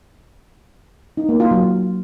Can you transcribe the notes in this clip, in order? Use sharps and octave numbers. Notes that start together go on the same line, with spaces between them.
D#4
A#3
F4
F#3